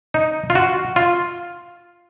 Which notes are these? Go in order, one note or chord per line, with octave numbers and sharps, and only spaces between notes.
D#4
F4
F#4
F4